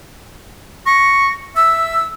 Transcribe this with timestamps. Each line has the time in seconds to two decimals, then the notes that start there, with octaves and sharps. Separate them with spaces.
0.86 C#6 A#6
1.56 E5 E6